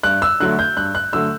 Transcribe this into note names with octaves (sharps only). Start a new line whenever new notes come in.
G2 F#6
E6
D3 F#3 A3 F#6
G6
G2 F#6
F#6
D3 F#3 A3 E6